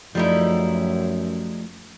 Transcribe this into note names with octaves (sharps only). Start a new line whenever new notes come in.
F#2 F3 G3 A3 D#4 E4